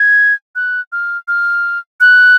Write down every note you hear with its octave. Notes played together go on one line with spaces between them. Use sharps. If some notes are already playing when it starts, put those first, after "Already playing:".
Already playing: G#6
F#6
F6
F6
F#6